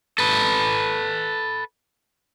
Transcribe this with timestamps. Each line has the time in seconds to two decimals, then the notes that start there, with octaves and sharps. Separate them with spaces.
0.19 A4 B4